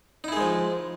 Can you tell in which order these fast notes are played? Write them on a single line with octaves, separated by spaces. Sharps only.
D#4 E4 G#4 G#3 F3